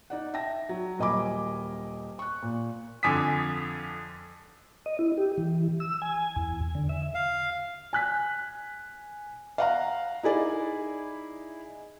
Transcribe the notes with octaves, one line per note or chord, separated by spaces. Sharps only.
D#4 D5 F#5
E5 G5 A5 A#6
F#3
D#1 A#4 D#5 G#5 B5 D6
C#6 F#6
A#2
F2 D3 G#5 D6 D#6 B6
D#5
E4
G4
E3
E6
G#5
E2
D3
E5
F5
G#5 F#6 B6
F5 F#5 A#5
D#4 E4 G#4 D5